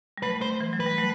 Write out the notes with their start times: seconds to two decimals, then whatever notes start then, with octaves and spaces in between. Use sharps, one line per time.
0.18 G3
0.23 F#3 A3 B4
0.41 C5
0.61 E3
0.73 F#3
0.80 B4
0.86 G3
0.98 F#3 A3